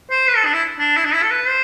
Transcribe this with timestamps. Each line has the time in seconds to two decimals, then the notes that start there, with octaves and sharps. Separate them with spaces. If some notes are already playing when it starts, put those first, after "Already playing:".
0.10 C5
0.27 B4
0.36 A4
0.45 D4
0.54 E4
0.79 D4
0.97 E4
1.05 D4
1.14 E4
1.22 A4
1.31 B4
1.48 C5